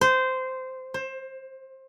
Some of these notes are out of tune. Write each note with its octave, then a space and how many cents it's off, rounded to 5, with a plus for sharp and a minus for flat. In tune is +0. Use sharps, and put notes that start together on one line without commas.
C5 -15
C5 +20